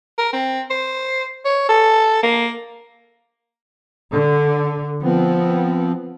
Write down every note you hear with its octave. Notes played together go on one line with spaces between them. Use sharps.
A#4
C4
C5
C#5
A4
A#3
D3
F3 B3 C4